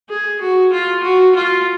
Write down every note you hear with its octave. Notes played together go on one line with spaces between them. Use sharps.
G#4
F#4
F4
F#4
F4